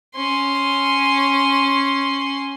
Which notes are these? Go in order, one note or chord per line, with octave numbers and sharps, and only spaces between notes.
C#4 C6